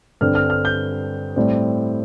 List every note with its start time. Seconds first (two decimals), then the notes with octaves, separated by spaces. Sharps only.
0.21 G2 D3 G3 C4 F6
0.35 F6
0.50 F6
0.65 G6
1.36 A2 G3 C4